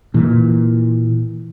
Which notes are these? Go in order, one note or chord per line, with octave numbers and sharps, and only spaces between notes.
A#2 E3